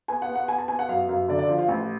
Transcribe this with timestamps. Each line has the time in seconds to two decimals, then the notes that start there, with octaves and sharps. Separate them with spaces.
0.08 B3 G#5
0.22 F#5
0.29 B3
0.35 F#5
0.48 B3 G#5
0.58 A5
0.68 B3 G#5
0.79 F#5
0.89 F#2 F5
1.09 F#2 F5
1.28 D3 D5
1.39 D5
1.48 F3 F4
1.59 F4
1.68 A1